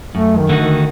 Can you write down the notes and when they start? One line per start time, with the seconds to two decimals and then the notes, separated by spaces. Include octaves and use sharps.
0.15 F#2 A3
0.38 D#3
0.49 D3 A3 D#4 F#4
0.61 D#3